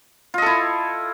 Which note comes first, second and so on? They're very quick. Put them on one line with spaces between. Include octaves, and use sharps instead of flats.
F4 D#5 A4 E4